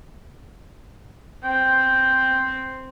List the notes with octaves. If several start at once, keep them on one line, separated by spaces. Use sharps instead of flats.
C4 G5